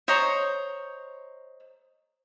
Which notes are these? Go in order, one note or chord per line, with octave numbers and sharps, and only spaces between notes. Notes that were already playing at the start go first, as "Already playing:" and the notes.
C5 C#5 D#5 A#5